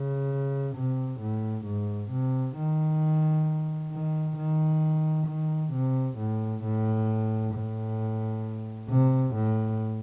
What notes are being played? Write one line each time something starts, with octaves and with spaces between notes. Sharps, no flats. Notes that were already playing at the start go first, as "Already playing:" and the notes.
Already playing: C#3
C3
A2
G#2
C3
D#3
D#3
D#3
D#3
C3
A2
A2
A2
C3
A2